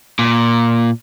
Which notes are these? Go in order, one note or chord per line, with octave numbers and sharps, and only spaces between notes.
A#2